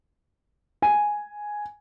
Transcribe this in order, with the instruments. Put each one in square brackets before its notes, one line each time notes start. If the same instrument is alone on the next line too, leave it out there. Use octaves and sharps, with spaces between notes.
[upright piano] G#5